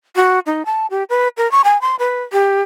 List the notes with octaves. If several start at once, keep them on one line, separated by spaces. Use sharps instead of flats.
F#4
D#4
A5
G4
B4
A#4
C#6
G#5
C6
B4
G4